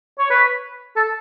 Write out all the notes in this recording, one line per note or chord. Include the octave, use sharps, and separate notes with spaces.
C#5
B4
A4